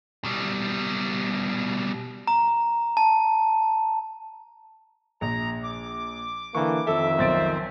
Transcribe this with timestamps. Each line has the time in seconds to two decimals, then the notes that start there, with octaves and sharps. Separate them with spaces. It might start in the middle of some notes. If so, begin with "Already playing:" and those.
0.25 B2 G3
2.27 A#5
2.97 A5
5.21 A#1 A#5
5.64 D6
6.55 D3 E3 A#3 C#6
6.87 F2 D#3 A4 E5
7.19 B1 C4 C5 A6 D7